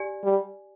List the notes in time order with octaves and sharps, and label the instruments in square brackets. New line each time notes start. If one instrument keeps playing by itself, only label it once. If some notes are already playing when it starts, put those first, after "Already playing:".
Already playing: [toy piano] G4 D5 G#5
[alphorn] G3